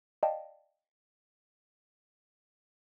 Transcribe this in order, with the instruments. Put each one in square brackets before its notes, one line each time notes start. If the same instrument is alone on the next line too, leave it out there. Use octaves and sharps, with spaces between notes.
[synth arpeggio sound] D5 D#5 F5 G5 A5